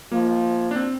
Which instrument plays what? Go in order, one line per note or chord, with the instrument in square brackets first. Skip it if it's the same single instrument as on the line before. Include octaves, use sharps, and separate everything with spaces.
[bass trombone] F3 [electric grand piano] A#3
[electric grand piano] D4
C4